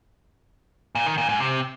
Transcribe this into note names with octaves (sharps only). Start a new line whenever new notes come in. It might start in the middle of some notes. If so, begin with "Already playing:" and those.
A#2
D#3
A#2
G#2
C3